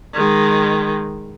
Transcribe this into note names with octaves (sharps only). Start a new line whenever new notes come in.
D#3 G#3